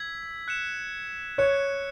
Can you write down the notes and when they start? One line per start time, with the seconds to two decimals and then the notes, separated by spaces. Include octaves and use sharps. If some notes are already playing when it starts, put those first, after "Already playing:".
Already playing: E6 G#6 B6
0.48 F#6 C#7 E7
1.38 C#5 F#6 C#7 E7